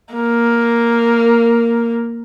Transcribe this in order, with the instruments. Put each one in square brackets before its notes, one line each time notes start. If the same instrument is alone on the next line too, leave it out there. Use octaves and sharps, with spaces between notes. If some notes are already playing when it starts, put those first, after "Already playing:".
[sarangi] A#3